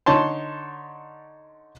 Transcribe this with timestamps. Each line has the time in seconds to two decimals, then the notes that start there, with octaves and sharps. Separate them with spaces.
0.06 D3 D#4 C#5 A5 C6